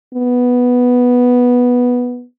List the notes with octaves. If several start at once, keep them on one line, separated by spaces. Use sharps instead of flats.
B3